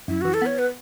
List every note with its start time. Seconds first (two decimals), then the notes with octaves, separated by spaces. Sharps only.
0.08 F#2 E4
0.21 E3 F#4
0.34 A4
0.42 B3 C#5
0.59 B4